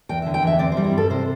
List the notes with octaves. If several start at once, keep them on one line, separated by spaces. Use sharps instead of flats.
E2 G5
E5
D3
G5
E2 E5
C4 D5
C5
G3
E4
G2 A4
C3 C5